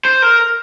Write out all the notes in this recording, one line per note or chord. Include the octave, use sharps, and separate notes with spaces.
C5
A#4